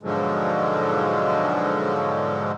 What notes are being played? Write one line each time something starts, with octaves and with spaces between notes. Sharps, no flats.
G#2 B2 D3 F3 F#3 G#3